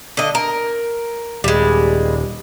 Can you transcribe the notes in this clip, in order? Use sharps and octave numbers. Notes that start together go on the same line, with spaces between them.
D3 D#5
A#4
D#1 G3 G#3